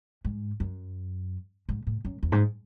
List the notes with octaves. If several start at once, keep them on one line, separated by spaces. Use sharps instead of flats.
G#2
F#2
G#2
A2
F#2
E2
G#2